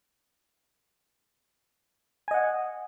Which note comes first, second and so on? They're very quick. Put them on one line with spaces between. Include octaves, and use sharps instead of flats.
G#5 D#5 F#5